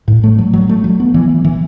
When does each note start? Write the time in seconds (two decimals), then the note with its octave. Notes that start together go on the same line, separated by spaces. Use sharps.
0.08 A2
0.24 A3
0.39 F#3
0.53 F#3
0.69 A3
0.84 F#3
1.00 B3
1.14 E3
1.29 E3
1.45 E3